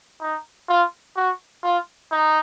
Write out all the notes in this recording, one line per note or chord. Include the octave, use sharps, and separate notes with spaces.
D#4
F4
F#4
F4
D#4